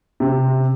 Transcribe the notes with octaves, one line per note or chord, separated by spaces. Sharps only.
C3